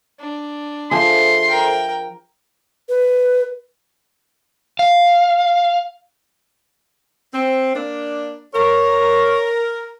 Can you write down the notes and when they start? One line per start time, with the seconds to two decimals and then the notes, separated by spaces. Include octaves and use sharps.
0.20 D4
0.91 F3 G#4 A4 C5 E5 C6
1.48 A#4 G5
2.89 B4
4.79 F5
7.33 C4
7.75 A#3 D4
8.54 A#4 C#5